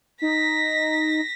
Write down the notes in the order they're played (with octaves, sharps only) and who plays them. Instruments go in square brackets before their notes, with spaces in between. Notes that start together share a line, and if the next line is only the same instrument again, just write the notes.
[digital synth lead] D#4 [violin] A#6 B6